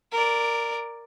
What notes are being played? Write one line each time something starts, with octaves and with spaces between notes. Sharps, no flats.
A#4 D5